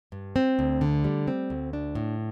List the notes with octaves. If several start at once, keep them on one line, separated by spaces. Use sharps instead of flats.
G2
C4
D2
D3
G3
C4
D2
D4
A2